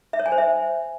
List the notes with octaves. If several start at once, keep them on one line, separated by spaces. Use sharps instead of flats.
E5
C#5
G#5
C5
E5